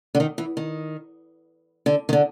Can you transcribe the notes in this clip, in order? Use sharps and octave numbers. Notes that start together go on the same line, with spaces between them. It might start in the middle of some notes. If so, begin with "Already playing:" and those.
D3
D#3
E3
D#3
D3
D#3
D3